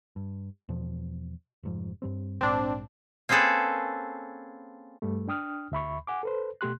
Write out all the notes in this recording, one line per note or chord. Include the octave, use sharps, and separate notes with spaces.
G2
E2 B2 F3
F1 G#2 F3
G2 G3 C4
A#1 G#2 C4 D4
A#3 C4 C#4 G#4 A4 B4
G2 G3 A3
D4 G5 D#6 F6
D2 E5 B5 C#6
F#5 G#5 D6
A4 B4 C5
B2 A3 G4 C6 F#6